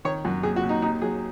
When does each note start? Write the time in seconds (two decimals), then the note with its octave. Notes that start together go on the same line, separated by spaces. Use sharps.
0.05 D#3 C#5
0.24 F#2 F#4
0.43 D#2 G#4
0.56 F#4
0.63 D#2
0.69 D#4
0.82 D#2 D#4
1.02 F#3 G#4